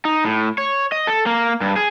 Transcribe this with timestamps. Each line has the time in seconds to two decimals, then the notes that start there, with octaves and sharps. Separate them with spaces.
0.05 D#4
0.25 A2
0.58 C#5
0.92 D#5
1.07 A4
1.26 A#3
1.61 G2
1.76 G#4